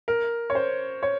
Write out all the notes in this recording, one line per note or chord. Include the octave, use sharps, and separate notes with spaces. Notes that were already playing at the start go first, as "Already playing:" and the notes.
A#4
C#5
C5
C#5